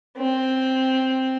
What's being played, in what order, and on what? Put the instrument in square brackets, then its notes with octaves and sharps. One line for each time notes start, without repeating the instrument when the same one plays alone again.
[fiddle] C4